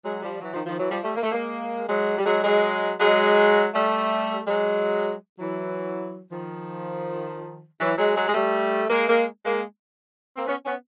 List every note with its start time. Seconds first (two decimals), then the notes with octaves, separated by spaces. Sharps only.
0.04 F#3 G#3
0.22 F3 G3
0.41 E3 F#3
0.53 D#3 F3
0.66 D#3 F3
0.78 E3 F#3
0.91 F3 G3
1.03 G3 A3
1.16 A#3
1.23 A3
1.32 G#3 A#3
1.89 F#3 G#3
2.18 G3
2.25 F#3 G#3
2.44 F#3 G#3
2.99 F#3 G#3
3.73 G3 A3
4.47 F#3 G#3
5.39 E3 F#3
6.31 D#3 F3
7.79 E3 F#3
7.97 F#3 G#3
8.15 F#3 G#3
8.28 G#3
8.34 G3 A3
8.89 G#3 A#3
9.08 G#3 A#3
9.45 G#3 A#3
10.37 A#3 C4
10.46 B3 C#4
10.65 B3 C#4